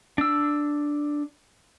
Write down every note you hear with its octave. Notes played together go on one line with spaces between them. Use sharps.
D4 E6